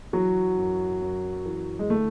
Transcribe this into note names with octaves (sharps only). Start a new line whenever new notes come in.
E3 F#3 F#4
F#2
F#2
E3
G#3
D3 A3